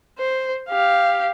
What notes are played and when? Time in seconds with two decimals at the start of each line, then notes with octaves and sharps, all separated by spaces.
0.19 C5
0.70 G4 F5